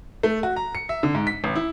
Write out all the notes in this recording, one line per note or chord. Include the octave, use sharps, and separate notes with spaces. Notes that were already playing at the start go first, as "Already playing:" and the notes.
A3
F#4
A#5
C#7
E5
D3
G#2
B6
A1
E4